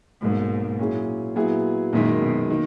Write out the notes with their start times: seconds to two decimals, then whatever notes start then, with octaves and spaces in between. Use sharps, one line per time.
0.22 B1 G#2 B2 A#3
0.79 A#2 F#3 C#4 E4 G#4
1.35 A#2 F#3 B3 E4 G#4
1.93 F#2 A#2 D#3 G#3
2.21 B2
2.50 D#3 A#3